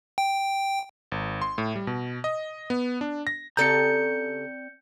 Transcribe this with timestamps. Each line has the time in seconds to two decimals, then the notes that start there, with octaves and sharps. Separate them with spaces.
0.18 G5
1.12 G#1
1.42 C6
1.58 A2
1.76 G3
1.87 B2
2.24 D#5
2.70 B3
3.01 D4
3.27 A#6
3.57 C#3 C4 G4 A4 D5 A#5 G6 C#7